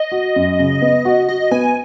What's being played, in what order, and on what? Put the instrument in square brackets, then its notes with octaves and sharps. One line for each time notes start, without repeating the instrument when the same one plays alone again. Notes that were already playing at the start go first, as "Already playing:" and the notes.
Already playing: [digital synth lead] D#5
[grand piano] F#4
F#2
C#3
B3
F#4
[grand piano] F#4 [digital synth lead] D#5
[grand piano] B3 [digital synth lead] G#5